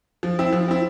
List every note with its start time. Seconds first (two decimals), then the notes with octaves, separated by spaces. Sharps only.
0.23 F3
0.39 C4 E4
0.53 F3
0.68 C4 E4